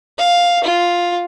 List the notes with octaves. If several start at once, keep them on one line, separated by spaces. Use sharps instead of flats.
F5
F4